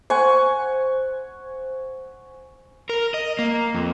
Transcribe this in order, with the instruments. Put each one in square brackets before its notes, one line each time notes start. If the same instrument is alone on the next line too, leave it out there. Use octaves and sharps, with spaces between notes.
[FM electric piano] C5 [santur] F#5 G#5 C#6
[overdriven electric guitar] A#4
D#5
A#3
F2